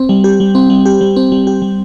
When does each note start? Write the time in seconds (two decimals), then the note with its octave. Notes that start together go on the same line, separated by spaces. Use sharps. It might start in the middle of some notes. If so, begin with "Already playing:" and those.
Already playing: C4
0.09 G3
0.24 G4
0.40 G3
0.55 C4
0.70 G3
0.86 G4
1.01 G3
1.16 C4
1.32 G3
1.47 G4
1.62 G3